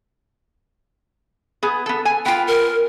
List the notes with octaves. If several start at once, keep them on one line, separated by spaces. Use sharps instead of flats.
B3 G#4
B3 A4
G#5
B3 F4 G5
A#4